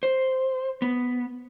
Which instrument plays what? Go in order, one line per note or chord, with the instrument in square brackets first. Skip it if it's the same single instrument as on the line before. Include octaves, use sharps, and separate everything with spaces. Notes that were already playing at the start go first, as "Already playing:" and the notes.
[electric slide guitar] C5
B3